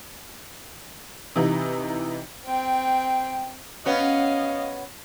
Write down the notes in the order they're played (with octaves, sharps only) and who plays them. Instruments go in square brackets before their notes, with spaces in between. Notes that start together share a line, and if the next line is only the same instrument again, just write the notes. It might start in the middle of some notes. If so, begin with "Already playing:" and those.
[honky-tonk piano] C3 E3 D#4
[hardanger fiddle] C4 G5
[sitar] B3 C#4 F#4 [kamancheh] D#5 F5